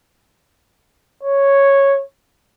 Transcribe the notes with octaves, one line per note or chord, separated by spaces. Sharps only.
C#5